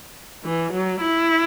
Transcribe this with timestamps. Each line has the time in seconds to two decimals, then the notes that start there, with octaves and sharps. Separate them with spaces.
0.44 E3
0.73 F#3
1.01 E4